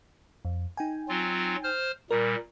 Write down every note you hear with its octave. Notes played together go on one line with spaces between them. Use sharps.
F2
D#4 G5 G#5
F#3 C4 F4
C5 F6
A#2 G3 A#4